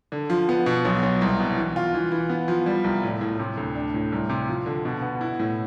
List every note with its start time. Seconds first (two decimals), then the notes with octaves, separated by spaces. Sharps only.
0.12 D3
0.30 F3
0.49 B3
0.66 B2
0.85 B1
1.03 B1
1.21 C2
1.39 B2
1.57 E3
1.76 F4
1.94 E3
2.12 E3
2.29 B3
2.48 F3
2.66 G3
2.84 C2
3.03 A2
3.21 A2
3.39 C3
3.57 D2
3.75 D4
3.94 A2
4.12 C2
4.29 C3
4.49 F3
4.66 D3
4.85 B2
5.02 B3
5.21 E4
5.39 A2